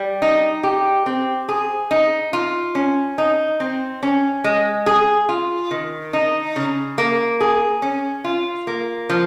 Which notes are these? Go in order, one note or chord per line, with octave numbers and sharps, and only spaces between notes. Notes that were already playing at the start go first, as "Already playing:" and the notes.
Already playing: G3
D#4
G4
C4
G#4
D#4
F4
C#4
D#4
C4
C#4
G#3
G#4
F4
D#3
D#4
C#3
A#3
G#4
C#4
F4
A#3
F3